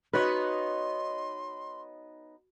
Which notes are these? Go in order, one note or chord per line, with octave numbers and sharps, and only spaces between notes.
B3 D#4 F#4 B4 C#5 C6